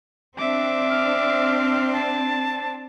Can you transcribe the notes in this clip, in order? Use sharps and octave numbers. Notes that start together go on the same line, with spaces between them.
C4 D4 E5 D6
F6
A5